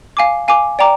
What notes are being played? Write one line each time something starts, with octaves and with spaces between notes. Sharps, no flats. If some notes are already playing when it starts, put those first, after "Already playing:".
F5 G#5 D6
F5 G#5 D6
D5 G5 A#5 D6